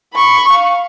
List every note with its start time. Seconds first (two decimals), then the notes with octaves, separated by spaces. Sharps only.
0.14 B5 C#6
0.53 F5